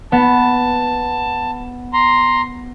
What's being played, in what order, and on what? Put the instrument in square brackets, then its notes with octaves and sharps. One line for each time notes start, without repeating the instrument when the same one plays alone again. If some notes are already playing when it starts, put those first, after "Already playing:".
[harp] B3 [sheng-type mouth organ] A5
[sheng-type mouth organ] A#5 C6